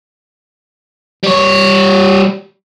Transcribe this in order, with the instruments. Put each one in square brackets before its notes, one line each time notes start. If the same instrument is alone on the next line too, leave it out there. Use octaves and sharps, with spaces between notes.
[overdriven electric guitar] G3 C#5